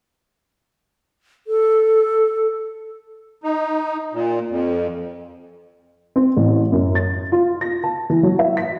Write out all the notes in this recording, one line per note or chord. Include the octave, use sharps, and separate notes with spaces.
A4
D#4
A#2
F2
C4
A1
F#2
A6
F4
A#6
A5
E3
F#3
E5
B6